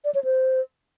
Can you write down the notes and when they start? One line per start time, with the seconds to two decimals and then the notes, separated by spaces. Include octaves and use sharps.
0.05 D5
0.15 C#5
0.24 C5